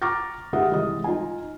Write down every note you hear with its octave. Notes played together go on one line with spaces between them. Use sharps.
A#5 C#6 D6 F6 A6 A#6
D#3 G#3 G4 E5 F#5 D#6
C2 E3 G#3 D#5 D#6
D#4 F4 G#5